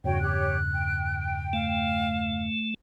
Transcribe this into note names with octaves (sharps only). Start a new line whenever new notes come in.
E2 G2 C#3 F#4 C#5 G5
G4 C#5 F#6
G5
A3 F5